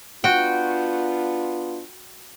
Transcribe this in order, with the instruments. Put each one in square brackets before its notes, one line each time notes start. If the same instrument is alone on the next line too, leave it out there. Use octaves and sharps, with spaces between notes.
[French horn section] B3 D4 F4 [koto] F#4 G5